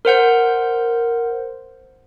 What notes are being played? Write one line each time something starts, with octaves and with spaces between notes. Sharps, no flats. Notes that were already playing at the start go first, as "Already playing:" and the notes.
A#4 C5 F#5 G6